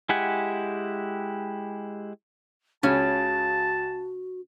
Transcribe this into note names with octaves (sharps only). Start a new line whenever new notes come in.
G#3 E4 G4 F#5 G#5
C#2 C#3 C#4 F#4 A5